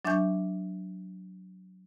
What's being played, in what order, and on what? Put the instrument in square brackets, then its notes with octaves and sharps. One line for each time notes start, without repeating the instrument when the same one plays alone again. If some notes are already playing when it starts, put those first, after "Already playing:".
[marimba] F#3 D4 E5 G#5 C#6 G6